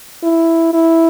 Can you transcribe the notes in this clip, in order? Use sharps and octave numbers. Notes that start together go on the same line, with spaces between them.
E4
E4